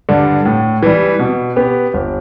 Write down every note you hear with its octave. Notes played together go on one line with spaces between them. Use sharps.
G2 D3
A2
E3 G3
B2
B3 G4
G1